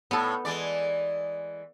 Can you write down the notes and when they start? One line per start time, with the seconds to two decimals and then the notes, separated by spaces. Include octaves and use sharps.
0.11 A2 B3 A4
0.45 E3 G#3 D5